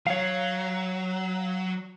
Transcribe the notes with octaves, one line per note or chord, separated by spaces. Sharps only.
F#3 C#5 F5